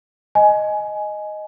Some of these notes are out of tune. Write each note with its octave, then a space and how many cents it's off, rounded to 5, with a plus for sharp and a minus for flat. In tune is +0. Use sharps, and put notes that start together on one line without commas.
D#5 +0 G#5 +15